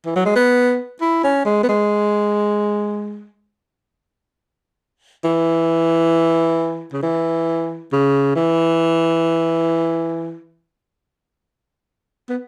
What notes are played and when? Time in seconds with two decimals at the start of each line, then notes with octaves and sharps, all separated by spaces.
0.06 E3
0.16 F#3
0.26 G#3
0.36 B3
1.01 E4
1.24 C#4
1.46 G#3
1.63 B3
1.69 G#3
5.24 E3
6.93 C#3
7.03 E3
7.92 C#3
8.36 E3
12.30 B3